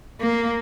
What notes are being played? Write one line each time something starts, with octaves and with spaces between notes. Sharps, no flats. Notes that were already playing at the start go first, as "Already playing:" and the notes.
A#3